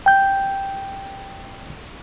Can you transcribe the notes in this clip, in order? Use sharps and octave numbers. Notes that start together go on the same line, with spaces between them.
G5 G6